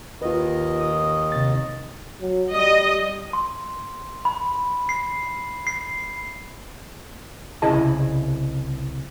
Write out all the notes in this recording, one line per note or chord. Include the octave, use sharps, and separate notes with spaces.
D#2 D#3 F4 B4 D#5
D#6
C3 A6
F#3
G3 D#5
C6
B5
C7
C7
C2 C#3 E4 G#4 D#5 A5